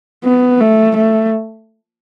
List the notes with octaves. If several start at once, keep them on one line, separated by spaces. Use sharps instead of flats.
B3
A3
A3